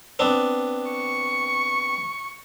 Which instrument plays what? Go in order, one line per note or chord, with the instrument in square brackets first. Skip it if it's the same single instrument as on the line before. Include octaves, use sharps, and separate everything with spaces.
[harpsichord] B3 C4 D4
[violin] C#6